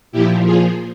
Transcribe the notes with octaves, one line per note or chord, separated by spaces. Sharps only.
A#2 F3 E4 G4
F4 G#4